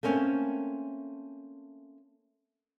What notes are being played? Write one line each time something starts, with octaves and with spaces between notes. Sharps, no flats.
A3 A#3 C4 C#4